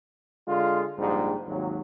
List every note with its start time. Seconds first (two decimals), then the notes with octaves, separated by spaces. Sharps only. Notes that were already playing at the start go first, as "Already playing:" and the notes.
0.47 D3 G#3 F4
0.98 A#1 G#2 D3 G3
1.47 G#1 D#2 F#3